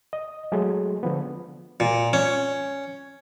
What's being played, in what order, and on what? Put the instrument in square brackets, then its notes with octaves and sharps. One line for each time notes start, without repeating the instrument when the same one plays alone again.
[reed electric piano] D#5
F#3 G#3 A3 G#4
D3 F3 B3
[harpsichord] A#2
C#4